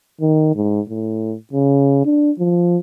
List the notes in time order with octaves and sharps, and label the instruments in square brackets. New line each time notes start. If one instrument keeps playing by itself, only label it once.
[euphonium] D#3
G#2
A2
C#3
D4
F3